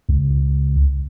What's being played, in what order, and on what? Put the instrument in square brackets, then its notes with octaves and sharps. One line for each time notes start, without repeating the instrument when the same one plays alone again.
[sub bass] C#2